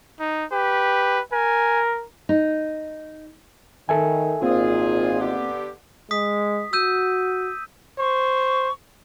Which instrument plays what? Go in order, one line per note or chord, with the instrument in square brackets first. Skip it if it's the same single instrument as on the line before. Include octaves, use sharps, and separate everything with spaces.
[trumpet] D#4
[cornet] G4 [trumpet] B4
[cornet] A#4 [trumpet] G#5
[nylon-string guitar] D#4
[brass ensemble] D#3 [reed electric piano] A4 E5 G#5
[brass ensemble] G#1 F4 [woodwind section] A#2 G#4 [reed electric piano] A#3 C4
[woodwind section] D3 B3 G4
[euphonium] G#3 [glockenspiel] D#6 B6
[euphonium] F#4 [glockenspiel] E6 G6 D#7
[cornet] C5 [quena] C#6